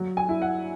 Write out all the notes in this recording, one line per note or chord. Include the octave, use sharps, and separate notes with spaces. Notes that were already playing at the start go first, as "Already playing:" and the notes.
Already playing: F#3
G#5
E4
F#5